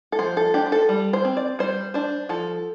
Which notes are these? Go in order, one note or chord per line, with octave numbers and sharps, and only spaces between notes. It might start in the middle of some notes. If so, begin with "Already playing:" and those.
A4
F3 C5
A4
D4 G4
C5
A4
G3
C5
C4
D5
G3 C5
D4 C5
F3 A4